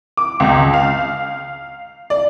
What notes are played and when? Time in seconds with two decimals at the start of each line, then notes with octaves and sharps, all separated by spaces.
0.17 D6
0.40 C#2
0.74 F5
2.10 D5